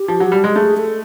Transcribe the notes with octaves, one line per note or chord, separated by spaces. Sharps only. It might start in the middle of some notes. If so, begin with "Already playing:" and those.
Already playing: G4
F3
F#3
G3
G#3
A3 G#4
A4